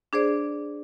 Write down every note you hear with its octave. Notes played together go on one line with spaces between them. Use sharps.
D4 G#4 C5 D5